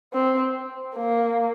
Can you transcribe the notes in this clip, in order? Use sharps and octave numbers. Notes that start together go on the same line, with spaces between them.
C4
A#3